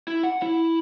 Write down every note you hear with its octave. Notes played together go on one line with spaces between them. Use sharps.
E4
F#5
E4